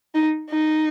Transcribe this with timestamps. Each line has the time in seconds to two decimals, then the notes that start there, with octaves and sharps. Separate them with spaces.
0.15 D#4
0.50 D#4